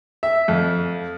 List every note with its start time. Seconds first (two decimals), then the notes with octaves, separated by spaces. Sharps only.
0.23 E5
0.48 F2